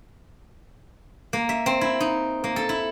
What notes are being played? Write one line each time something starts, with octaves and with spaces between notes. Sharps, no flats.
A#3
E5
C4
E4
D#4
A#3
A4
E4